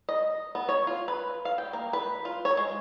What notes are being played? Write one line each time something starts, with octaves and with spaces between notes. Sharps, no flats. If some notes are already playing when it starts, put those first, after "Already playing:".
D#5
B3
C#5
F4
B4
F5
G5
A#3
B4
F4
C#5
G#3